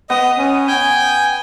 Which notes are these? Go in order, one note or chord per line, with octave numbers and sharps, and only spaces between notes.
B3 D#5 D#6
C#4
G5 G#5 G6